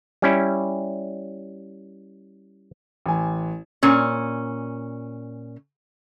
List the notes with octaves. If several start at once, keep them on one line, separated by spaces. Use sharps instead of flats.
G3 C#4 E4
A1 G#5
A#2 C#4